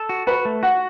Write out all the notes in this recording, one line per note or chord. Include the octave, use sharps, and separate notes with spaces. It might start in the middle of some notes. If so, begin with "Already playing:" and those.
Already playing: A4
F#4
F#4 B4
A3
F#4 F#5